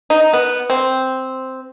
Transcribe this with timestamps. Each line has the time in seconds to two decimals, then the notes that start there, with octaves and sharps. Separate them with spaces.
0.10 D#4
0.33 B3
0.70 C4